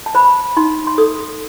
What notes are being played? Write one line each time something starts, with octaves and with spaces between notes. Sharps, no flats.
A5
C5 B5
D#4 C6
C6
A4 D#6